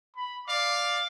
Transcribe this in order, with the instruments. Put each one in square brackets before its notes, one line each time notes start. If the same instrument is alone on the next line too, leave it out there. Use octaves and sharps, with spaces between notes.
[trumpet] B5
[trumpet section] D5 F5 [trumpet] D6